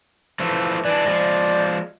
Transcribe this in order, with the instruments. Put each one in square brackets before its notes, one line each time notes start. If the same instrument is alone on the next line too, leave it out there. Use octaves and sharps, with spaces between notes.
[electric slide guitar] E3 F3 A3
[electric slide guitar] E3 D4 [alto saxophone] D5
[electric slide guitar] F3 G#3